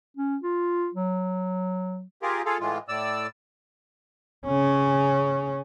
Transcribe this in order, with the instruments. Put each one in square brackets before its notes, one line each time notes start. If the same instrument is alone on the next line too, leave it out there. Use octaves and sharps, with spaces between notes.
[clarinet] C#4
F4
F#3
[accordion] F4 G4 G#4 A#4
F4 G#4 A4 F5
A2 E3 G#3 F4
A2 D5 E6
[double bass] C#3 C#4